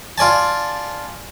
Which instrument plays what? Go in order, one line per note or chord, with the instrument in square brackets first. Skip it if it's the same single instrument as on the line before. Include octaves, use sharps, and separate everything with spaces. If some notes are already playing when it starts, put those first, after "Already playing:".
[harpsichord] F4 D5 G#5 A5